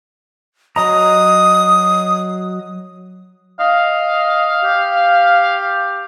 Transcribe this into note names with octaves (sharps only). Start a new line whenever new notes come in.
F#3 D#5 A#5 D#6
D#5 F5
G4